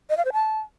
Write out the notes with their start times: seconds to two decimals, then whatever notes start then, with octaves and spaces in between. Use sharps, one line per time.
0.10 D#5
0.17 F5
0.25 C5
0.33 A5